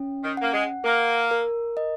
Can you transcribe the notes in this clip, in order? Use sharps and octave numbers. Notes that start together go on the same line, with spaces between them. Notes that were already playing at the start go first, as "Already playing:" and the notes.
Already playing: C#4
D#3
A#3 F#5
G#3
A#3 A#4
A#4
D#5